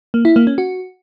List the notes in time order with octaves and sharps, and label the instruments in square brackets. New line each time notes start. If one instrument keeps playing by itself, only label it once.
[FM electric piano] A#3
E4
A#3
C#4
F#4